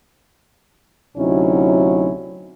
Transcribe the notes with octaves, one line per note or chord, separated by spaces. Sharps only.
D2 C3 F#3 C#4 D#4 E4